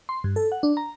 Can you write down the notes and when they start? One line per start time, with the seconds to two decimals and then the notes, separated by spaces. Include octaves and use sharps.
0.09 C6
0.24 G2
0.36 A4
0.52 F#5
0.63 D4
0.77 A#5